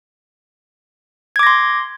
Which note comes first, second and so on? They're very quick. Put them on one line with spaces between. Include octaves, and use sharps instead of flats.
G#6 D6 A#6 C6